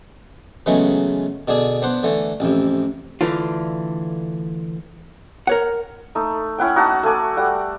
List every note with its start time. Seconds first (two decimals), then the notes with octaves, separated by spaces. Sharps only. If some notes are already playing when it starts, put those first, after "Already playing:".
0.66 C#3 E3 F#3 G#3 A3 B3
1.48 B2 D3 D4 G#4
1.82 B3 D4 C5 F#5
2.03 D3 E3 A3
2.40 A1 F2 C3 E4
3.21 D3 E3 A3 D4 F4
5.47 A#4 C#5 F#5
6.15 A3 D#4
6.58 C#4 E4 F#5 G5
6.76 D#4 F#4 F#5 A5
7.03 A3 A4 G#5 D6
7.37 G3 F#5